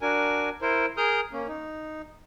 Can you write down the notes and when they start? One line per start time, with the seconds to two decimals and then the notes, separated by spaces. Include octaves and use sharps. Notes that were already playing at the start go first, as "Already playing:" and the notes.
0.01 D4 F#4 A#4 G#5
0.62 E4 A#4 C5
0.97 G#4 A#4 D#6 F6 G6
1.33 A#3 C#4
1.47 D#4